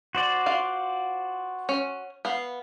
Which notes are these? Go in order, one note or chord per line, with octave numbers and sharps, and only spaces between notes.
F#4 C5 D5
F4 F5
C#4
B3 F5